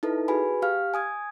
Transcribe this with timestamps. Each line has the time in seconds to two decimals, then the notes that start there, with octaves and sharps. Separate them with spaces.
0.03 D#4 E4 A4 B4
0.28 F#4 G#4 B4 G#5 B5
0.62 G4 F5 F6
0.94 G#5 D#6 G#6